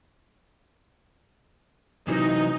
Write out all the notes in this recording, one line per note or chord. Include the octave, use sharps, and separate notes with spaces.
C3 E3 F#3 D#4